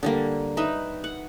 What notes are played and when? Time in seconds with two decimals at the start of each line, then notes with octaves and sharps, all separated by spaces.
0.03 D3 G3 A#3
0.57 D#4 B4 E5
1.04 F#5